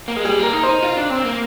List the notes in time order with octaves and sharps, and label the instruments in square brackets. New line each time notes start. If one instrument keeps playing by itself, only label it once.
[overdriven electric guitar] A#3
G#3
[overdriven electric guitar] G3 [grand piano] G#4
[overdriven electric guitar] A#3 [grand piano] A#4
[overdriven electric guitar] D#4
[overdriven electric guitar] D#4 [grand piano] C5
[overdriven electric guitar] F4
D4
C4
A#3